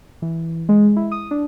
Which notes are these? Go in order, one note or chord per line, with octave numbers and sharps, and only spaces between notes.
E3
G#3
E4
D#6
D4